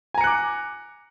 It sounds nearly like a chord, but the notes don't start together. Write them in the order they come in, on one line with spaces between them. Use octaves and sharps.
G#5 A#5 C#7 F#6 D6